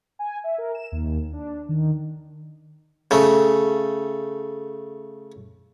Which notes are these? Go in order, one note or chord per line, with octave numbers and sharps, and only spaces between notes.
G#5
E5
A#4
E7
D#2
D4
D#3
C#3 A3